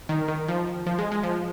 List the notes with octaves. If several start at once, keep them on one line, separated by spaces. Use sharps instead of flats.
D#3
D#3
F3
F3
G#3
G#3
F3